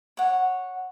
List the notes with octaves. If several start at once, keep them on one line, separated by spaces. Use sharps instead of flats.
C#5 F#5